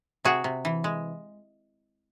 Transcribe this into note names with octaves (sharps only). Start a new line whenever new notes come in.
C3 F#4 G#4
C3
E3
G#3